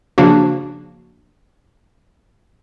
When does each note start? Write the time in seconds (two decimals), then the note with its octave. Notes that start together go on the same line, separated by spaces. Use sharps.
0.18 C#3 F3 A#3 D4 F#4